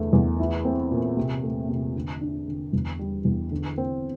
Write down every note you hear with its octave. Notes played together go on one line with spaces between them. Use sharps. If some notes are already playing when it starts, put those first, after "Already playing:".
Already playing: E2 D3 A3
E2
E4
C4
A#2
C3
A3
C3
D3
D4
D3
E2
G3
E2
D3
C4